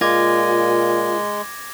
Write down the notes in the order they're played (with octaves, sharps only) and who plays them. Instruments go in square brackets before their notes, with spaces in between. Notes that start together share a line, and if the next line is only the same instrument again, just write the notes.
[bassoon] A#2 [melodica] G#3 [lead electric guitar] F4 [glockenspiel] D6 G#6 A#6